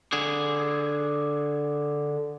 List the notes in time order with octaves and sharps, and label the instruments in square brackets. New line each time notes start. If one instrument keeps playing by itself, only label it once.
[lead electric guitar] D3 G#4